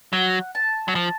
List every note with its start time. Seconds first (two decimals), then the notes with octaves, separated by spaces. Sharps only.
0.13 F#3 F#5
0.55 A5
0.88 F#3
0.95 F3 A5